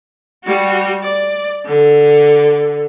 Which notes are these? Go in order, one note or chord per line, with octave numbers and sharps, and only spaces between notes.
G3 F#4
D5
D3